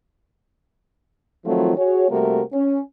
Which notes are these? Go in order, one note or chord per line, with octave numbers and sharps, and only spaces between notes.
D#3 F3 F#3 A3 C4 F4
F#4 G#4 C#5
C3 G3 A3 A#3 F#4 A#4
C#4